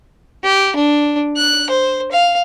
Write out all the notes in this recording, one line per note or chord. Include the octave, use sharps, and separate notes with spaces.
G4
D4
F#6
C5
F5